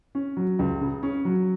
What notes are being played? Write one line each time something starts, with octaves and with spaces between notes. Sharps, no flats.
C#4
F#3
C#2
C#3
C#4
F#3